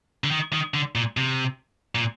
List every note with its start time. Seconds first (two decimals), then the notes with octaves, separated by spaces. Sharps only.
0.24 D3
0.31 D#3
0.53 D#3
0.74 D3
0.95 A#2
1.17 C3
1.95 A#2